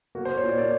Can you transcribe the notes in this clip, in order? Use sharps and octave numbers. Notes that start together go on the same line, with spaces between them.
A#3 F#4
C5
A#3
C#5
A#2 D5
A#3 D5